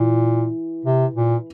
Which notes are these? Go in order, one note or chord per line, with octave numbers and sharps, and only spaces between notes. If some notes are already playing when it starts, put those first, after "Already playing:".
Already playing: A#2 E3 E4
C3
A#2